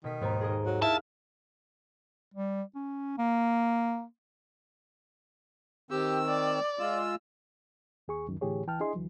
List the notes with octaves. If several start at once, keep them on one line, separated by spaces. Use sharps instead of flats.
B2 D#3 B6
D#2 G#2 B3 C5 A#5
G#4 A#4 D#5
F#3
E4 F5 A5
G3
C#4
A#3
D#3 C4 G4 E6
D5
G#3 F4 E6
D#2 G#4 C#6
C#2 F#2 D#3
A2 D3 E3 G4 G#4 C#5
C#2 E3 G5 A5 F6
D4 E4 G#4 D#5 C6
D2 D3 E3 F#3